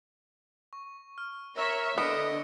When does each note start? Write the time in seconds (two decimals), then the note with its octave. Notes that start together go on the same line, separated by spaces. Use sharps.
0.73 C#6
1.18 F6
1.58 A#4 C#5 E5 E6 A#6
1.98 D3 B3 D#5 F6 C#7 D7